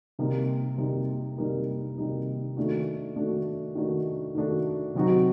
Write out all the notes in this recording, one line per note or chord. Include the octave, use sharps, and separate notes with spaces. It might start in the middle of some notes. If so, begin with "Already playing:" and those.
C3 G3 A#3 D#4
C3 G3 A#3 D#4
C3 G3 A#3 D#4
C3 G3 A#3 D#4
D#3 A3 D4 F#4
D#3 A3 D4 F#4
D#3 A3 D4 F#4
D#3 A3 D4 F#4
C3 F#3 C4 D#4 F#4